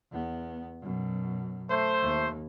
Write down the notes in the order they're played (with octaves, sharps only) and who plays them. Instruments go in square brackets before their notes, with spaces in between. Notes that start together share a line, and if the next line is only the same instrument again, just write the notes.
[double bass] E2 B3
F#2 B2
[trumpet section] A3 C5
[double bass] D#2